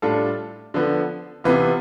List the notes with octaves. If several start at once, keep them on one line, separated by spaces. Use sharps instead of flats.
A2 G3 D4 F4 A4
D3 F3 B3
C3 E3 B3 F4